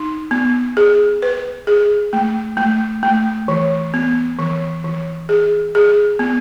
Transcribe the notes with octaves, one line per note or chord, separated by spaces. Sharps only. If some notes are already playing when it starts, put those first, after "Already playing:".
Already playing: D#4
B3
G#4
B4
G#4
A3
A3
A3
E3
B3
E3
E3
G#4
G#4
B3